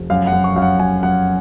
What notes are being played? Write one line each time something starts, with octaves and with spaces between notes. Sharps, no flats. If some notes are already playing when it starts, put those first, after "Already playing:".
Already playing: F1
F#2 F5
F#5
F#2
C#6
F#2 F5
F#5
F#2 G#5
F#2 F#5